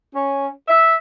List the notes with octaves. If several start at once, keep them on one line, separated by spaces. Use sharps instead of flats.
C#4
E5